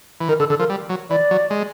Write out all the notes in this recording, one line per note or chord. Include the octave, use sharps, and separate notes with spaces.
E3
D#3 A#4
D3 A4
D3 A4
F3 A#4
G3
F#3
E3 D5
F#3
G#3